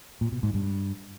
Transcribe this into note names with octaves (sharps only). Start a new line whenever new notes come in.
A#2
B2
G#2
G2